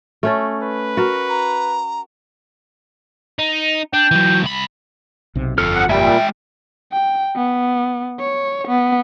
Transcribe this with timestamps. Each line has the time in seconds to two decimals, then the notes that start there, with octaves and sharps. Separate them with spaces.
0.23 A3 C#4 A4
0.63 B4
0.97 F#4 A#4
1.29 A#5
3.39 D#4
3.94 D4 G5
4.11 E3 F#3
4.42 C2 B5
5.35 B1 C3 C4
5.58 G1 F2 F4 A4 F6
5.75 F#5
5.90 A#2 G3 G#3 E5 G5
6.93 G5
7.36 B3
8.20 C#5
8.68 B3